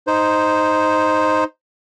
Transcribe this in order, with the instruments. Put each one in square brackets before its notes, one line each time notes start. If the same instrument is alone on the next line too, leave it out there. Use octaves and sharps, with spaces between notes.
[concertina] D#4 C5